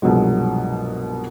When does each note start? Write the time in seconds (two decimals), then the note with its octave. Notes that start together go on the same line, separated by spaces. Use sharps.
0.02 C2 G2 B2 F3 F#3 G#3